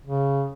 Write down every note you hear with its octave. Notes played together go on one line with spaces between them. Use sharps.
C#3